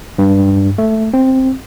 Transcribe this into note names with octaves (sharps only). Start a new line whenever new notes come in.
G2
A3
C4